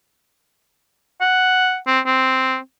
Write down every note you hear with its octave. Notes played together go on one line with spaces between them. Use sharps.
F#5
C4
C4